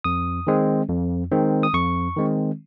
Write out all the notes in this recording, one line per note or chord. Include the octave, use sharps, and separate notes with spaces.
F2 D#6
D#3 G#3 C4
F2
D#3 G#3 C4
D#6
F2 C#6
D#3 G#3 C4